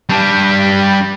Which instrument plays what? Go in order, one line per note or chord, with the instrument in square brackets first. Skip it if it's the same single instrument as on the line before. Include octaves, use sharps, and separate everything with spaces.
[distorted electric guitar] G3 D4